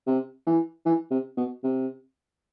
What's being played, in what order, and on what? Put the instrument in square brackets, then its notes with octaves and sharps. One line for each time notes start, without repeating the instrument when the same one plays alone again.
[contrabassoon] C3
E3
E3
C3
B2
C3